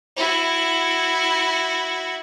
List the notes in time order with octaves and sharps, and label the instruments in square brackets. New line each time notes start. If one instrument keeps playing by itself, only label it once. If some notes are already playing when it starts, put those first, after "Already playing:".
[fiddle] E4 F#4